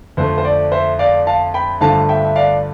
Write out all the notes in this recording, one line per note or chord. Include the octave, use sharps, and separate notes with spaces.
F2 D3 A3 C5
C5
D5
C5 E5
D5 F5
F5 A5
G5 B5
G2 D3 F3 A3 F5 A5
E5 G5
E5
D5 F5